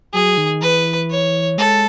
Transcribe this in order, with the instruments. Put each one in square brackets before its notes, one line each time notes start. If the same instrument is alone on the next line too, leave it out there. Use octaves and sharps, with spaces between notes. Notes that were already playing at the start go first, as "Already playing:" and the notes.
[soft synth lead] F#3 [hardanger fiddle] G#4
[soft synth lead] D#3
[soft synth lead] E3 [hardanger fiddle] B4
[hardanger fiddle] C#5
[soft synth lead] G#3 [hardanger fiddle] A4